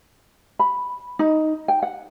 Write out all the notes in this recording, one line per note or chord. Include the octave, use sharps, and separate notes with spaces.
B5
D#4
G5
F#5